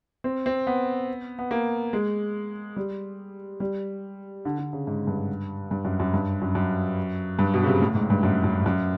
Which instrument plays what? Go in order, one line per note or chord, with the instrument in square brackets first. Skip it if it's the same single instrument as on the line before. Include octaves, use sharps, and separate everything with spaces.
[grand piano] C4
C4
B3
B3
A#3
G#3
G3
G3
D3
D3
C#3
G#2
G2
G2
F#2
F#2
G2
F#2
F#2
G2
B2
C#3
C3
A2
G#2
G2
F#2
F#2
F#2